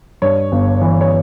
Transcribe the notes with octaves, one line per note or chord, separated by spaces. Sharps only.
G2 C#5
G1
E3
C#5